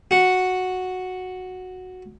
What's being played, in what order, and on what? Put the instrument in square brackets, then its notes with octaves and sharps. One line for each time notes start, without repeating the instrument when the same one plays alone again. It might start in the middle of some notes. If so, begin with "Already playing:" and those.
[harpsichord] F#4 F#5